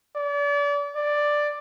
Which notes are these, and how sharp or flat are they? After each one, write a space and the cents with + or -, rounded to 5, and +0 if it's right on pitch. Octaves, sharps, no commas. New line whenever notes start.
D5 -35
D5 +5